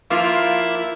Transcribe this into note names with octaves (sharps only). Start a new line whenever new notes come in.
F3 A#3 E4 F4 A#4